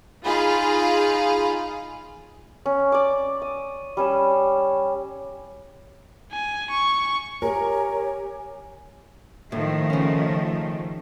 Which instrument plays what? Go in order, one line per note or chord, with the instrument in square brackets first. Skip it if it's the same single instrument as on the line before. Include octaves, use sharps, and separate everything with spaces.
[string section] D#4 F4 G#4 F5 B5
[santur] C#4
D5 D6
D#6
G3 C#4 E6
[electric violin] G#5
C#6
[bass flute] G4 [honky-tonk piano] A#4 [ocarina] C#5 [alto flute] G#5
[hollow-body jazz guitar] A2 [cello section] D#3 F3 A3
[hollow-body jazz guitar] C#3 C#4